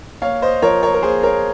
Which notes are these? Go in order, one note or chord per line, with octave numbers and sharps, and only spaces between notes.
A#3 C#5 F5
C5 D#5
F3 A#4 C#5
A#4 C#5
A#4
A#3 G#4 C5
A#4 C#5